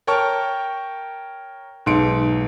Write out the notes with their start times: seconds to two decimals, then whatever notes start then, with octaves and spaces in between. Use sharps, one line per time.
0.07 A#4 C#5 G5 A5 C#6 F6
1.86 B1 G#2 C6 C#7 D7